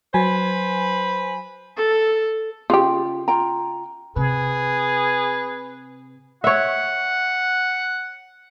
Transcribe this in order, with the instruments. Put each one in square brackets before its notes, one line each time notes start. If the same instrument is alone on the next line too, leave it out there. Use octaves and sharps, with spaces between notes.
[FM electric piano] F#3 G#5 [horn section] B4 C5 B5
[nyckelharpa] A4
[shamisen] C#3 G4 [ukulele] F4
[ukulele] F4 G5 A#5
[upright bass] C3 [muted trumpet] G#4 [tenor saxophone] B4
[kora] C#5 E5 [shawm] F#5